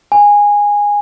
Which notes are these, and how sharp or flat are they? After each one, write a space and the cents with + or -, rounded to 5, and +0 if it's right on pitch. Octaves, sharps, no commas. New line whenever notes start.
G#5 -15